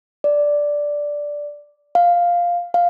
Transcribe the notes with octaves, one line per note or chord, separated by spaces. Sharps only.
D5
F5
F5